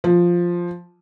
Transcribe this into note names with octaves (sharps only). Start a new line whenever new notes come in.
F3